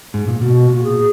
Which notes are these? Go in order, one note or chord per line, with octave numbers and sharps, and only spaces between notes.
G#2
A#2
B2 F#4
A#2 F#4
G#4